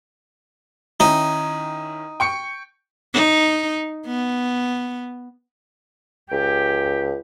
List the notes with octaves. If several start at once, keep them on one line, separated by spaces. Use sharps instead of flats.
D#3 C#4 D#4 E4
G5 C#6 C#7
D#4
B3
C#2 G4